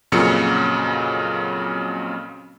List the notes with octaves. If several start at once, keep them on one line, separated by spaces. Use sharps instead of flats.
F2 A#2 C#3 F#3 C#7